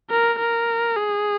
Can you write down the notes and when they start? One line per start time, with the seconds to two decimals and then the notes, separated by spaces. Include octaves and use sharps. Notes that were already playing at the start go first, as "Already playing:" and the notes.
0.11 A#4
0.39 A#4
0.97 G#4